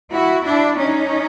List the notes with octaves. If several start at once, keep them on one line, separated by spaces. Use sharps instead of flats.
E4 F#4
D4 E4
C#4 D#4